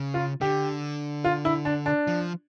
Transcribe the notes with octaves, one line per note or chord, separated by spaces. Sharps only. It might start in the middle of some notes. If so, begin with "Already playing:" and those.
Already playing: C#3
F4
D3 G4
F4
E4
D4
D4
F3